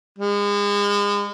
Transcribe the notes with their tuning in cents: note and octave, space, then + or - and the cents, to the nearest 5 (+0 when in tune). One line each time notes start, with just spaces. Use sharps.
G#3 -35